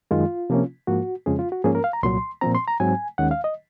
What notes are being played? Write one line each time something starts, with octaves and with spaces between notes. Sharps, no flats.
F#2 D#3 G#3 F4
C3 F3 A#3 C#4
G#2 F3 A#3 F#4
F2 C#3 F3 G#3 C#4 G#4
F4
F#4
G#2 F3 A#3 C#4 G#4
A#4
F5
A#5
C2 A#2 F#3 C6
A#2 F3 C4 A#5
C6
A#5
G#2 F#3 C4 G#5
D#2 D#3 G#3 C#4 F#5
F5
D#5